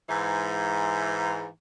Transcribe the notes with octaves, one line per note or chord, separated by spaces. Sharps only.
G#2 E3